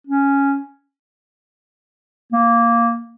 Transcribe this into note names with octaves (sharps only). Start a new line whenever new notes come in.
C#4
A#3